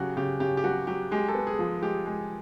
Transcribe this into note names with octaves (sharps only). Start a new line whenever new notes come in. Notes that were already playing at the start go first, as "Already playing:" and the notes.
Already playing: C#3 F#3 F#4 G4
C#3 G4
C#3 G4
G4
F#3 F#4
F#3 G4
G#3 G4
A4
B3
G#4
F3
G#3 G4
G#3